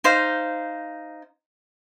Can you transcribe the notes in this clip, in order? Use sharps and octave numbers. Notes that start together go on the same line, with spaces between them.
D#4 C5 F5